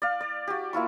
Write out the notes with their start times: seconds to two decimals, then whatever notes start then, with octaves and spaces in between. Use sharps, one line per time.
0.02 D5 F5
0.21 D5
0.47 F#4 G4
0.73 A#3 E4 F4 C#6